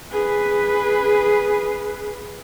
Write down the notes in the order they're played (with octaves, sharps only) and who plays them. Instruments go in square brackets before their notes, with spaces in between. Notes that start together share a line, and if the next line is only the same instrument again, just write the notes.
[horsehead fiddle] G#4 B4